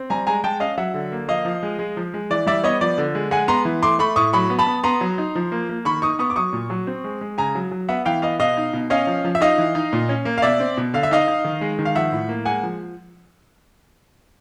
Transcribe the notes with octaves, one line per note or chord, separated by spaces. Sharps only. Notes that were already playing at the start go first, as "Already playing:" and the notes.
Already playing: C4
G3 G#5 A#5
G#3 G#5 A#5
G#3 G5 A5
C#4 D#5 F5
F#3 E5 F#5
D3
A#3
F3 D#5 F5
F3
G#3
G#3
F3
G#3
E3 D5
G3 D5 E5
B3 C#5 D#5
F3 D5
D3
G#3
G#3 F#5 G#5
B3 A#5 C6
E3
A3 C6 D6
A3 B5 C#6
A2 C#6 D#6
F#3 B5 C#6
B3
A5 B5
B3
B3 A#5 C6
F#3
D#4
F3
A#3
A#3
D#3 B5 C#6
D#4 C#6 D#6
B3 C#6 D#6
D6
F#3 C#6 D#6
A#2
F#3
C4
G#3
G#3
C#3 G#5 A#5
F#3
F#3
B3 E5 F#5
E3 F5 G5
B3 D#5 F5
B2 D#5 F5
D#4
B2
C#4 D#5 F5
F3
F3
E5
D#4 D#5 F5
E3
D#4
A#2
C#4
A#3
F5
B2 D5 E5
C4
B2
D3 F5
E5
D#4 D#5 F5
D#4
D#3
G#3
D#3
F5
F3 E5 F#5
A2
A#3
G#3 F#5 G#5
F3